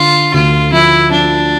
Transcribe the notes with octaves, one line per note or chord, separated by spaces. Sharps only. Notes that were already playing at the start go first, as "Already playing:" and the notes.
Already playing: D3 F4
D2 F4
F3 E4
F3 D4